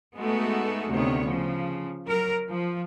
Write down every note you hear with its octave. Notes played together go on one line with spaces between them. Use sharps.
G#3 A3 B3 D#4 F#4 A4
D2 C3 D#3 B3 C#5
C#3 F3
F#3 A#4
F3